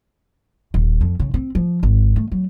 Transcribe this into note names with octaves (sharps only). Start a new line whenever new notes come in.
D#1
F2
C#3
C4
F3
G#1
A3
F#3